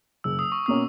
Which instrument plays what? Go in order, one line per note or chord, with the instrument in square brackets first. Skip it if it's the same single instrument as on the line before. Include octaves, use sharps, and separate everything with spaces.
[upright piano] F#1 [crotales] E6
[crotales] D#6
C#6
[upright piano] B2 A#3 C#4 [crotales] D#6